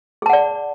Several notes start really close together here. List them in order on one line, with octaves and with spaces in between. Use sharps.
G#4 A5 F#5 D5